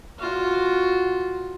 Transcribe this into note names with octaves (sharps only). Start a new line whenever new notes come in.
F4 F#4